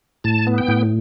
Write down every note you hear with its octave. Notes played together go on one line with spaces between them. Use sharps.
A2 A5
B3
G5
A2